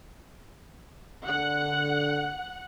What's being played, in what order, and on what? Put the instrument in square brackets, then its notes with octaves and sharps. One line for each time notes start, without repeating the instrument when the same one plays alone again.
[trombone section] D3 [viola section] F#5